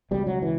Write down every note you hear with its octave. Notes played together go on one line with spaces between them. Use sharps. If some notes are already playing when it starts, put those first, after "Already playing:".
C#2 B2 G3
F#3
E3